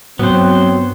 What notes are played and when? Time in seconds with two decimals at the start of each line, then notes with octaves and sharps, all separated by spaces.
0.19 G2 F#3 B3 C4 C5